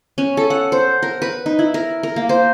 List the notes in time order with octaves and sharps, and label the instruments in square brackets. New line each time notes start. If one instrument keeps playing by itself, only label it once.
[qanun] C#4
A4
F#5
C5
A#4
B4
D#4
E4
A#4
A#4
A#3
C5